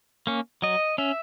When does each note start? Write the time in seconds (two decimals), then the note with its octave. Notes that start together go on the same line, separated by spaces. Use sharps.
0.27 A#3 C#4
0.62 F#3 D#5
0.98 C#4 E5